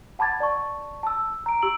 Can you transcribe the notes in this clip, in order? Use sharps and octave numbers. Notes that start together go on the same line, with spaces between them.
F#5 A5 B5 D6 G#6 A6
D5 A5 C#6
A5 E6
A#5 D7
G4 E6 D7 F#7